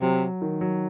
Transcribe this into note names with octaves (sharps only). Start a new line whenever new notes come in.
C3 F#3
D#3
F#3